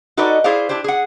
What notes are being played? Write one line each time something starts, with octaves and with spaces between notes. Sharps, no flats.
D#4 F#4 A4 B4 D5 D#5
E4 G#4 C5 D5 F5
D4 E4 G4 C5
G#4 F#5